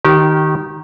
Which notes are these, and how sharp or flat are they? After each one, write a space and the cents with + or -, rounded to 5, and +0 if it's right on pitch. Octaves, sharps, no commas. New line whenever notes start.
D#3 +0 G4 -25